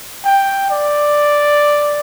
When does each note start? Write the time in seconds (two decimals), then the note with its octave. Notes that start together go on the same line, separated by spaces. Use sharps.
0.25 G5
0.71 D5